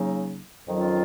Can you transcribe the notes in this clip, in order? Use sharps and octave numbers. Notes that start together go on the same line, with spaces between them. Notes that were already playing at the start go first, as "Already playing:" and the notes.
Already playing: C#3 F#3 A#3 D#4
F2 D#3 F#3 C#4 F4